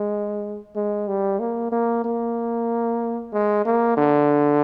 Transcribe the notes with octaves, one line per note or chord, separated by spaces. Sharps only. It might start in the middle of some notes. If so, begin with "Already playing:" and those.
Already playing: G#3
G#3
G3
A#3
A#3
A#3
G#3
A#3
D3